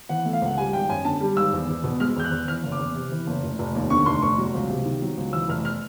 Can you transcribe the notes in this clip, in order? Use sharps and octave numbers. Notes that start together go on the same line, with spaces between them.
E3 F#5
A3
F5
C#2 F#5
G3 G#5
G#1 G5
F#2 G#5
D3 A5
G3
G#1 E6
E2
E2
B2
G#3 F6
E2 G6
F#6
E2
E3 F6
F#1
D6
E2
C3
E3
F#1
F1
F1
D#2
D3 C#6
F1 C6
F1 C#6
F#3
C#2
C3
D#3
F#3
C#2
E3 E6
F1 F6
F6